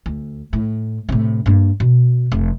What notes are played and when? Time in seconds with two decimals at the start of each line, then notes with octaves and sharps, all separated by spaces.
0.06 D2
0.53 A2
1.09 A2 C3
1.46 G2 A#3
1.80 B2
2.32 F1